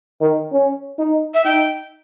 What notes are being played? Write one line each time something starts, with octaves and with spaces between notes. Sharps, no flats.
D#3
C#4
D#4
E5
D#4 G5